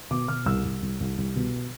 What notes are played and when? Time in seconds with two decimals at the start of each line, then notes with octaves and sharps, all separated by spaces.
0.11 B2 D6
0.28 B2 F6
0.46 C2 E6
0.65 C2
0.83 C2
1.00 C2
1.18 C2
1.36 B2